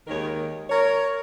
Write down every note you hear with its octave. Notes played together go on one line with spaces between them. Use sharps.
D#2 D#3 G#3 A#4 C#5
A#4 C#5